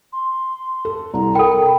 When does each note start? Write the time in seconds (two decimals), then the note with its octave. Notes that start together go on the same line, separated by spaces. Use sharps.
0.13 C6
0.85 A4
1.14 C2 A#5
1.35 A4 A#4 G5 B5